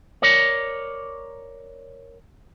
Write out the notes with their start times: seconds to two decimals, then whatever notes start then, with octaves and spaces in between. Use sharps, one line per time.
0.22 A#4 C#5 D5